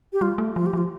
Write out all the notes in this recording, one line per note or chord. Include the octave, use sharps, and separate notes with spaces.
G4
G3 F4
A3
F3 F4
G4
F3 F4